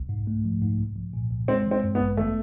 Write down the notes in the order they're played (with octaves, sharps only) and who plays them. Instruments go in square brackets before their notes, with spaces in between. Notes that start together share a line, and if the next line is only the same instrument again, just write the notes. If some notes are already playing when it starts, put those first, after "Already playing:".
Already playing: [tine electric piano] C2
G#2
A3
F3
G#2
C2
F3
A#2
C2
[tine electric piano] G#3 [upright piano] C4
[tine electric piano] E3
[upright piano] C4
[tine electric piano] G2
[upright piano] B3
[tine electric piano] A1
[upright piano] A3 [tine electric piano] B3